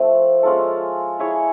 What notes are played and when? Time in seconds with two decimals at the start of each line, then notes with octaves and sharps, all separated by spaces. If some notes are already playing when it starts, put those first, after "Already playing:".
Already playing: F3 A3 C4
0.43 G#3 C#4 F4 A4
1.19 E4 G#4 C#5 E5